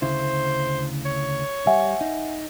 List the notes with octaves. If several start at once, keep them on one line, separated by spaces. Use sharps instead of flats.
D2 C#3 E4 C5
C#5
G3 E5 F#5 G#5
D#4